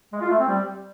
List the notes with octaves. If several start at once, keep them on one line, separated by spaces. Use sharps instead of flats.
G#3
F4
A3
C4
G3